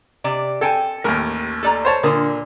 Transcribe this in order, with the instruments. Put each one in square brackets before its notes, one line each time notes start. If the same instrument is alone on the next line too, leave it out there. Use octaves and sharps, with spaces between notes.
[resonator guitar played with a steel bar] C3 D5
[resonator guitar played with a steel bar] C4 G5 G#5 [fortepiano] A4
[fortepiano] A1 D#2 [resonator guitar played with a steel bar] A#4
[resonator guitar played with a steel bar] A4 D5 A#5
[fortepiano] C5 C#5 A5
[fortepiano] A#2 A#3 D#6 [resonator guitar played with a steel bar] D3